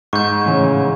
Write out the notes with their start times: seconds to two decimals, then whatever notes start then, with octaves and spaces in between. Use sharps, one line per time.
0.13 G#2 C#6 G6
0.46 A2 C#3 E3